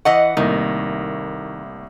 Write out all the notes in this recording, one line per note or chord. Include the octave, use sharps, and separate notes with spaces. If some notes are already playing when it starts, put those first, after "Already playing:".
E3 D#5 F#5 C#6
C2 A2 D#3 A#3